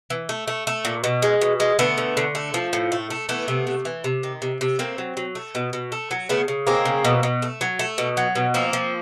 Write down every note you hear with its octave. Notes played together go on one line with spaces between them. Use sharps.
E3
A3
A3
A3
A#2
B2
G#3
B2
G#3
D3 A3 B3
D3
D3
A3
F3
A2
A3
A3
E3 A3 B3
C3
C3
E3
C3
D#3
C3
C3
A3 A#3 C4
F#3
F#3
A3
B2
B2
A3
F#3
C#3 A3 B3
C#3
G#3 A#3 C4
C#3
B2
B2
A3
F#3
A3
B2
F#3
B2
F3 A#3 C4
F3